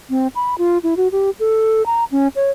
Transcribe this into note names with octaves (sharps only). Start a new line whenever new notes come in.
C4
B5
F4
E4
F#4
G4
A4
A#5
C#4
C#5